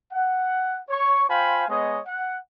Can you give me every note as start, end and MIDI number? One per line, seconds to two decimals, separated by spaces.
0.13 0.80 78
0.90 1.25 73
0.90 1.25 85
1.29 1.64 65
1.29 1.64 72
1.29 1.64 77
1.29 1.64 79
1.29 1.64 80
1.29 1.64 83
1.69 2.00 56
1.69 2.00 59
1.69 2.00 68
1.69 2.00 73
1.69 2.00 75
2.06 2.37 78